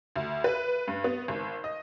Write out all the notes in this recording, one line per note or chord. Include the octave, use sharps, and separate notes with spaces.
D2
B4
G2
B3
G#1
D#5